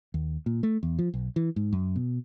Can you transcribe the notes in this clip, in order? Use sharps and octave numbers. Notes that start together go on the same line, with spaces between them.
D#2
A#2
A3
E2
F3
B1
E3
G#2
F#2
B2